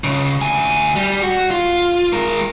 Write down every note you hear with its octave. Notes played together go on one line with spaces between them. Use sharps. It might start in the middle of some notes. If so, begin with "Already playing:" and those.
C#2 C#3
D2 G#5
G3 G4
F#4
F4
G#3 A#4